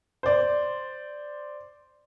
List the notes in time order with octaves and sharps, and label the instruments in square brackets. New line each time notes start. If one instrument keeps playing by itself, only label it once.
[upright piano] C5 D5